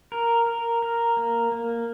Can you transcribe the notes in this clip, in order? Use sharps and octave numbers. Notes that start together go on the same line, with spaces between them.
A#4
A#4
A#4
A#3
A#3